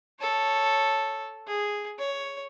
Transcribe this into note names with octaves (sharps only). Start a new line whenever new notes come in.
A4 C#5
G#4
C#5